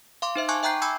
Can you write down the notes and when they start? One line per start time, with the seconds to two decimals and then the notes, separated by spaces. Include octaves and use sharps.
0.22 F5 C6 D6
0.36 D#4 C5 E5
0.48 G#5 A5 C#6 D6 F#6 G#6
0.63 E5 G5 A#5 F#6 G6 C7
0.82 G#5 B5 D6 E6 G6 G#6